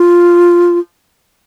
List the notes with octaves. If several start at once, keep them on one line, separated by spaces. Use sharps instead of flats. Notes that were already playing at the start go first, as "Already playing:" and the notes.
Already playing: F4